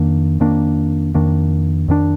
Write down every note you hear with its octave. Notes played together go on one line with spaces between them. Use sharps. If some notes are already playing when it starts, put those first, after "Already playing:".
Already playing: F2 D#3 A#3 D4
F2 D#3 A#3 D4
F2 D#3 A#3 D4
F2 D#3 A#3 D4